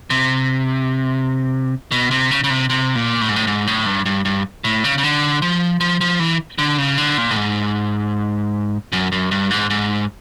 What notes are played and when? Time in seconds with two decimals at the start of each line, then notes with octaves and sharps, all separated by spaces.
0.10 C3
1.91 B2
2.11 C3
2.31 C#3
2.44 C#3
2.50 C3
2.69 C3
2.95 A#2
3.21 A2
3.28 G#2
3.36 A2
3.47 G#2
3.67 A2
3.86 G2
4.06 G2
4.25 G2
4.64 A2
4.84 C#3
4.98 C#3
5.03 D3
5.42 F3
5.80 F3
6.01 F3
6.19 E3
6.58 D3
6.78 C#3
6.98 D3
7.18 A#2
7.31 A2
7.37 G#2
8.92 F#2
9.12 F#2
9.31 G2
9.51 G#2
9.70 G#2